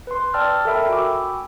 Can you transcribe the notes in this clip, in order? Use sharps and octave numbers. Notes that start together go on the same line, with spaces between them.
B4 C6
D5 G5 A5 E6 F6
A4 A#4 D#5 E5 G5 B5
F#4 G5 G#5 B5 D6 E6